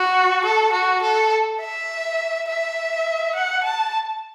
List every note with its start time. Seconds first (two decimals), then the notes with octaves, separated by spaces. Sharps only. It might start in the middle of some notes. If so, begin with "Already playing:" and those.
Already playing: F#4
0.44 A4
0.72 F#4
1.02 A4
1.60 E5
2.47 E5
3.35 F#5
3.63 A5